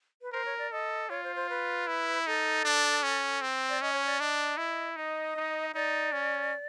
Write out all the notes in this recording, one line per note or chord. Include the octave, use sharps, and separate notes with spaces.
B4
A#4 C5
C#5
D5
A4 D#5
F4 C#5
C5
C5
B4
E4
D#4 A4
D4
C#4
C4
D5
C#4 D#5
C#5
D5
D4 D#5
E4
D#4 D#5
D#4
D#4 D5
C#4